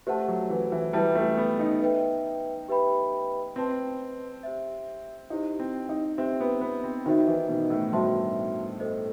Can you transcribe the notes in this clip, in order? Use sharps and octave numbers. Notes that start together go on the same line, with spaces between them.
A3 G4 C5 F#5 A5
F#3
E3
E3
G3 E4 B4 E5 A5
A3
B3
D#4
B4 E5 G5
G4 B4 E5 G5 B5
C4 B4 D#5 A5 C6
G4 C5 E5
D#4 E4 G4 C5
C4
D#4
C4 G4 C5 E5
B3
B3
C4
D#3 D#4 F#4 C5 E5
E3
B2
A2
G2 F#4 C5 E5 A5 C6
A4 C5 D#5